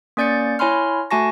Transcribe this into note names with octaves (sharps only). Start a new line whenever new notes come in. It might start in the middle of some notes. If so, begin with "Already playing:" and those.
A#3 C#4 D5 G6 A6 C#7
E4 C#5 G#5 B5 C6 F6
A3 F#4 G#5 A5 C#6 A#6